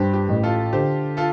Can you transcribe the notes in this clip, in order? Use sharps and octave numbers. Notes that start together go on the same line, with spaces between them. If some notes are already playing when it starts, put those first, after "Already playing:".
Already playing: G2 G4 C5
G4
A1
F4 A4
D3 G4 C5
F4 A4